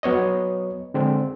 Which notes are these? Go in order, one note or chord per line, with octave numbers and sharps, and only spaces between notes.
F#3 B3 C#5 D#5
D3 G#3 C4